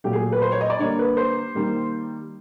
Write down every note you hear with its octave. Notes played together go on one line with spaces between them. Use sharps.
A#2 F#3 A3 G4
G#4
B4
C5
C#5
D#5
D5
D3 G3 A#3 C#5
B4
C5
D#3 G3 A#3